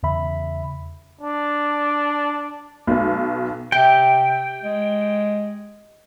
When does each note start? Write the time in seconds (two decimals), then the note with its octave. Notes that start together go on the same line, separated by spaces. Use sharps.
0.03 E2 C#3 E5 B5
1.21 D4
2.87 B1 B2
3.72 C3 G4 G5
4.63 G#3